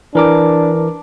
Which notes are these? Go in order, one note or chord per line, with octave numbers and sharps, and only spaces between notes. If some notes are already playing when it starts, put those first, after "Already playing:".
E3 D4 A#4 D6